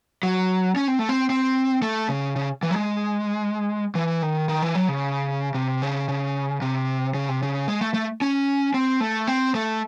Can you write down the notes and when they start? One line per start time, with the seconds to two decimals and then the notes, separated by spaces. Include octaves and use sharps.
0.23 F#3
0.76 C#4
0.88 C4
0.99 A3
1.09 C4
1.30 C4
1.82 A3
2.09 C#3
2.36 C#3
2.63 E3
2.71 F#3
2.76 G#3
3.95 E3
4.22 D#3
4.49 D#3
4.62 E3
4.75 F#3
4.88 C#3
5.54 C3
5.82 C#3
6.08 C#3
6.62 C3
7.14 C#3
7.29 C3
7.42 C#3
7.68 G#3
7.81 A3
7.94 A3
8.21 C#4
8.74 C4
9.00 A3
9.27 C4
9.55 A3